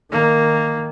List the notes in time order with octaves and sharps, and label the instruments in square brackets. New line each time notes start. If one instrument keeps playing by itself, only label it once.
[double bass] D#3 [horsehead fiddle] A#3